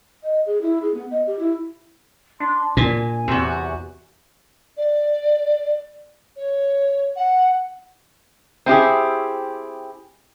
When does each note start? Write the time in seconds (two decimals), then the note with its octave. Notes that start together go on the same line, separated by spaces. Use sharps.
0.24 D#5
0.46 G#4
0.62 E4
0.82 G#4
0.94 B3
1.11 D#5
1.27 G4
1.39 E4
2.40 D4 C6
2.77 A#2 G#5
3.28 E2 C3 F#4
4.77 D5
6.37 C#5
7.16 F#5
8.66 C4 E4 G4 G#4